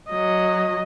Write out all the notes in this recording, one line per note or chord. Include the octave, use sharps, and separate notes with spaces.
F#3 D#5